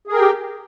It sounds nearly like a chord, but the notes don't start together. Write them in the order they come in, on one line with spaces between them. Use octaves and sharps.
G#4 A#4 G5 G4